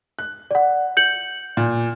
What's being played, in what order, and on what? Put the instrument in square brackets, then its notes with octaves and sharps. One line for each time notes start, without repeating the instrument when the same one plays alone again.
[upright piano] F#6
[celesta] D5 F#5
G6 C#7 F#7
[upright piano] A#2